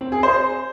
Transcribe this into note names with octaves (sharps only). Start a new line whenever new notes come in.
C4
G#4
C5